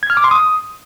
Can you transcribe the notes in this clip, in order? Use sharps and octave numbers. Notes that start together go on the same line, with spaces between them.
G#6
F6
D6
C6
D#6